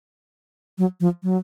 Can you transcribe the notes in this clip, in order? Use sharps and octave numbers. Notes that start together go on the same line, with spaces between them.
F#3
F3
F#3